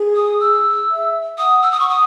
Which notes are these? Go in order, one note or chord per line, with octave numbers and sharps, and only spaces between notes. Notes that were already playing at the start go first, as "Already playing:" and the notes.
Already playing: G#4
D#6
E6
E5
F#5 D#6
E6
D#6
C#6
D#6